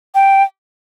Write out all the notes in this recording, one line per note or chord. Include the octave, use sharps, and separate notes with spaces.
G5